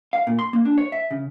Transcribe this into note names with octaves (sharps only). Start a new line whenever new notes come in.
F5
A#2
C6
A#3
D4
C#5
E5
C#3